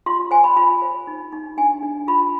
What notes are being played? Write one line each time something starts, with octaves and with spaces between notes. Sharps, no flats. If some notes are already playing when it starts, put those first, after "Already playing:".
F4 C6
C5 G#5
B5
F4 B5
C5
D#4
D#4
D4 G#5
D4
F4 B5